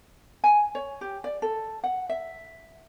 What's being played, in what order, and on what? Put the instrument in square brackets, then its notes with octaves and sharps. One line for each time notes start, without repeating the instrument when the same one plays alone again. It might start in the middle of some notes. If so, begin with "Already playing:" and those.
[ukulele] G#5
C#5
G4
D5
A4
F#5
E5